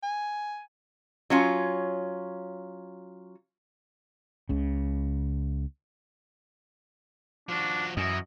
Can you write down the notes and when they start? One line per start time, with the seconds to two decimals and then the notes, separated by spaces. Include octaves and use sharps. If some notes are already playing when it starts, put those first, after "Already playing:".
0.03 G#5
1.30 F#3 C#4 F4
4.49 C#2 C#3
7.49 F3 D4 F#4
7.97 F#2 E3 E4 D#5